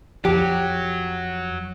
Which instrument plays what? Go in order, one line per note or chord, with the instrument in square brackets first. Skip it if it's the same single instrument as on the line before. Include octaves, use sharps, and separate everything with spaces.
[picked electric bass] F2 F3 [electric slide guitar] F#3 [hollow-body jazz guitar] G4